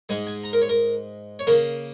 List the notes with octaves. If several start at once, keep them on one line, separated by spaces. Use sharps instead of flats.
G#2 G#3 G#5
G#5
A#5
A#4
C#5
A#4
C#5
C#3 A#3 A#4